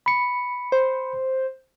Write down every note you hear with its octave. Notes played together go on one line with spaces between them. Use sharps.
B5 C#7
C5